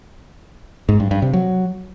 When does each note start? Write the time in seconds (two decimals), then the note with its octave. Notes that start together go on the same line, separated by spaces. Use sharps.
0.89 G#2
1.00 G2
1.11 G2
1.22 C3
1.33 F#3